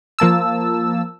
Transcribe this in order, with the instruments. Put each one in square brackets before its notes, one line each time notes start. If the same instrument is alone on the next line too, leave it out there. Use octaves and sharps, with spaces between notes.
[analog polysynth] F3 A#3 A5 E6